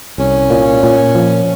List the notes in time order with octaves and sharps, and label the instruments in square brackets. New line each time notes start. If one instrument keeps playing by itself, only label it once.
[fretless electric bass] C2 [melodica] C#4
[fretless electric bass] A#2
A#2
F3